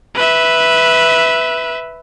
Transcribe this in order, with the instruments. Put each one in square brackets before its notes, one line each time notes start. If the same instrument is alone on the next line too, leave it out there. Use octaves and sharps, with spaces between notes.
[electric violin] B4 E5